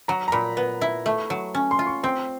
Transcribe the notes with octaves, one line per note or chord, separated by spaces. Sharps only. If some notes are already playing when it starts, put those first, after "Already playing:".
F#3 A#5
A#5
A#2 B5
B3
E4
A3
F#3
C#4
C6
F4
C#6
C4 C6